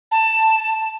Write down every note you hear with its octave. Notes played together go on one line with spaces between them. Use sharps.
A5